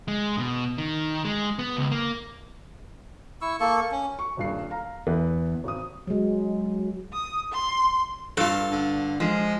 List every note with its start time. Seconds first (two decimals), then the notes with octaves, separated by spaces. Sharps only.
0.08 G#3
0.38 B2
0.78 D#3
1.25 G#3
1.59 B3
1.77 C#2
1.91 A#3
3.42 E4 C#6 E6
3.60 A#3 A4 C#6
3.92 C#4
4.19 C#6
4.37 D#1 G2 C7
4.70 F5 A#5
5.07 E2 B4
5.64 G#1 D#6
6.07 F#3 G#3
7.13 D#6
7.52 C6
8.37 G2 F4 A4
8.72 D3
9.20 F3 G#3